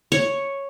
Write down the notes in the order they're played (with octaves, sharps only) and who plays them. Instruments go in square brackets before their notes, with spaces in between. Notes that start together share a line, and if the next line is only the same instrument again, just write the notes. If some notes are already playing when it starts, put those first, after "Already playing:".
[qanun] C#5